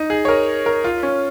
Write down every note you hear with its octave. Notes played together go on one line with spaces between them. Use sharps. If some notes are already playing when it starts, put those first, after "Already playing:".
Already playing: D#4
G#4
C#5
A#4
A#4
F4
C#4